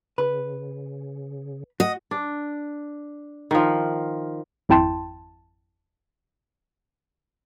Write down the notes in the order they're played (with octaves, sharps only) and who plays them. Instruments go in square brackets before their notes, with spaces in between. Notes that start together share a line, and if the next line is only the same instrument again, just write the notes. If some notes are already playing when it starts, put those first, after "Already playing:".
[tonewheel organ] C#3 [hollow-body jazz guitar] B4
[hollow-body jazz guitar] F#4 [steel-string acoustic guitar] D#5
[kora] D4
D#3 F3
[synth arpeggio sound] G#1 F2 E4 G5 A5 C6